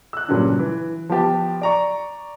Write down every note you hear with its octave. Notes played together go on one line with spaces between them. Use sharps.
E6 F#6
G2 A#2 C#3 F#3 C#4 D4
E3
F3 B3 G4 A5
D5 A#5 C#6